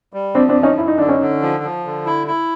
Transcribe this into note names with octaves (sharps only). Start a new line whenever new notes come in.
G3
F3 C4 D4
C4 D4
F#2
C#4 D#4
F#2 E4
D#4
D3 D4
C#4 D#4
D3
F3
F3
D3
E4
E4